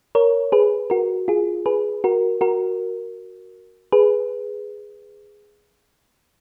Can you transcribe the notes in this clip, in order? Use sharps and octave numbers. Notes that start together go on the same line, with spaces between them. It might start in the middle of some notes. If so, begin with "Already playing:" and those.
A#4 C#5
G#4 B4
F#4 A#4
F4 G#4
G#4 B4
F#4 A#4
F#4 A#4
G#4 B4